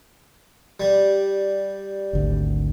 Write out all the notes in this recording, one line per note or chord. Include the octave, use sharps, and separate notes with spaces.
G3
G#1 D2